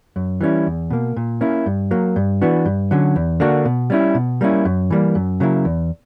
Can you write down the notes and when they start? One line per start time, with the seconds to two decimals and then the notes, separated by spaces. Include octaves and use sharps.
0.16 F#2
0.41 E3 G3 C#4 E4
0.67 E2
0.90 B2 A#3
1.17 A#2
1.41 A#3 C#4 E4
1.66 G2
1.91 F#3 A#3
2.16 G2
2.41 E3 B3 D4 F#4
2.65 G2
2.91 D3 F#3 C#4
3.16 E2
3.40 D3 A#3 D4 F#4
3.65 B2
3.90 G3 C#4 E4
4.15 B2
4.41 G3 A#3 C#4 E4
4.65 F#2
4.90 E3 G3 A#3
5.15 F#2
5.40 C#3 F#3 A#3 E4
5.65 E2